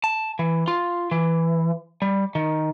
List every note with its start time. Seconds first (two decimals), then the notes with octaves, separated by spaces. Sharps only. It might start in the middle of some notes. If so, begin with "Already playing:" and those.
0.04 A5
0.39 E3
0.68 F4
1.11 E3
2.02 G3
2.35 D#3